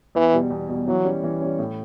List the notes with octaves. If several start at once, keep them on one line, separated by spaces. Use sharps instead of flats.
E2 E3
B2 G3
E2
B2 G3
E3 F#3
G3 C#4
E3
G3 C#4
A2